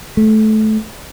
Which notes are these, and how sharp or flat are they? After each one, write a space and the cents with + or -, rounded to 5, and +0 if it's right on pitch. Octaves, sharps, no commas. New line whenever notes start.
A3 -20